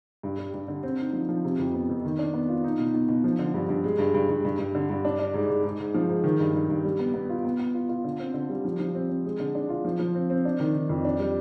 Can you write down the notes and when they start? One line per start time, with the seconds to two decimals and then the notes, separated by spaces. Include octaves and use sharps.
0.23 G2
0.39 G3
0.54 G2
0.68 D3
0.83 C4
0.99 D#4
1.13 F3
1.29 F3
1.44 C3
1.59 F2
1.74 B3
1.89 F2
2.05 D#3
2.19 D4
2.34 B3
2.49 F4
2.64 D#4
2.79 B2
2.94 B2
3.09 B2
3.24 F3
3.39 D3
3.54 G2
3.69 G2
3.84 G#3
3.98 G2
4.14 G2
4.29 G2
4.45 G2
4.59 G2
4.75 D3
4.90 G2
5.05 D4
5.19 D4
5.34 G#2
5.50 G#2
5.64 G#2
5.79 G#2
5.94 F3
6.10 G#2
6.24 D#3
6.40 G2
6.54 G2
6.70 G2
6.84 G3
6.99 B3
7.14 B3
7.29 F4
7.45 B3
7.59 B3
7.74 F4
7.89 F4
8.04 D3
8.20 C4
8.34 D3
8.49 G3
8.64 F3
8.80 F3
8.95 C4
9.10 C4
9.25 G#3
9.40 D3
9.55 D4
9.69 F4
9.85 F3
9.99 F3
10.15 C4
10.30 C4
10.45 D4
10.60 D#3
10.75 D#3
10.89 F2
11.05 D4
11.20 G3